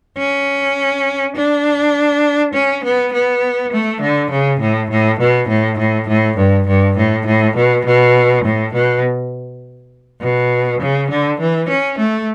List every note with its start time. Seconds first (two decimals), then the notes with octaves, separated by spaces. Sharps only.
0.17 C#4
1.35 D4
2.53 C#4
2.84 B3
3.12 B3
3.72 A3
4.01 D3
4.31 C#3
4.60 A2
4.90 A2
5.19 B2
5.48 A2
5.78 A2
6.07 A2
6.37 G2
6.67 G2
6.97 A2
7.26 A2
7.56 B2
7.85 B2
8.44 A2
8.73 B2
10.21 B2
10.80 C#3
11.10 D3
11.40 E3
11.68 C#4
11.98 A3